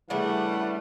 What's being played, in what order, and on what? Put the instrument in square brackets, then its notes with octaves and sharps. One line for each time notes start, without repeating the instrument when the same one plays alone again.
[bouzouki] C#3 D4 [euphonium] E3 [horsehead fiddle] G3 A3 [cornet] F#5